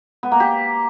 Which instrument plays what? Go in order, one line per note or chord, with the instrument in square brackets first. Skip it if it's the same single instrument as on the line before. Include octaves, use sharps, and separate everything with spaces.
[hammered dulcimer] B3
A#3
G4